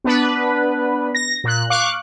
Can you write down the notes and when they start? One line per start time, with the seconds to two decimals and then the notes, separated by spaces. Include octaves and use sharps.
0.04 B3 D4 B4
1.15 A#6
1.44 A#2 F#6
1.70 F5 C#6 D6 F#6